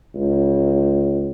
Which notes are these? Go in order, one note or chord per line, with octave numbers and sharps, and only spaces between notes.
C#2